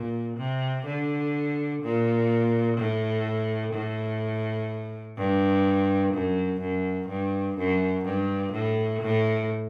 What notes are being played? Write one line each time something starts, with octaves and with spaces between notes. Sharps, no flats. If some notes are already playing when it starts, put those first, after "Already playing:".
Already playing: A#2
C3
D3
A#2
A2
A2
G2
F#2
F#2
G2
F#2
G2
A2
A2